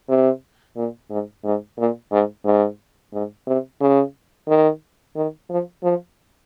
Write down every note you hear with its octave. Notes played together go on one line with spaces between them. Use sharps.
C3
A#2
G#2
G#2
A#2
G#2
G#2
G#2
C3
C#3
D#3
D#3
F3
F3